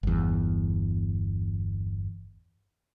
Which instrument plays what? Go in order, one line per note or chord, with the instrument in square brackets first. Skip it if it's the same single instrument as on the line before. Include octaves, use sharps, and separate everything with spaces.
[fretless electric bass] G1 E2